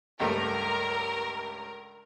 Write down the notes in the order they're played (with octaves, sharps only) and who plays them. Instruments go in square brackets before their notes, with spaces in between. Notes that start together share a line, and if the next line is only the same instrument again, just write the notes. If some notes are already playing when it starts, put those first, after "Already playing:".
[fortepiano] C#2 G2 A3 [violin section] A#4